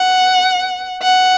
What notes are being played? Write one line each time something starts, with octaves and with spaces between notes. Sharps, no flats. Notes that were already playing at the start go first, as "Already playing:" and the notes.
Already playing: F#5
F#5